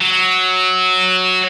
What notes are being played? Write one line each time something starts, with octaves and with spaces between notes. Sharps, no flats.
F#3